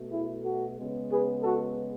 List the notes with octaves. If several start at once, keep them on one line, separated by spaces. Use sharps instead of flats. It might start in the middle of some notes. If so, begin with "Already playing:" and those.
Already playing: B2 A3
E4 G#4
F#4 A4
C#3 G#3 B3
G#4 B4
F#4 A4